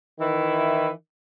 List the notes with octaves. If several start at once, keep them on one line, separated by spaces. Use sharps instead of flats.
D#3 E3 E4